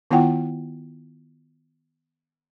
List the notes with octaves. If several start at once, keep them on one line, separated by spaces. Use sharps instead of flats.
D#3 B3 E4 F4 F#5 G5